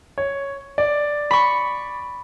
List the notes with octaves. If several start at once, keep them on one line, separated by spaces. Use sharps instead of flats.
C#5
D5
B5 C#6